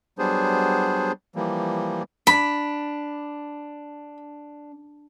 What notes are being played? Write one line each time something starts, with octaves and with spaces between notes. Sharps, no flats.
F#3 G3 B3 D4 G#4 C5
E3 F3 G3 A#3
D4 B5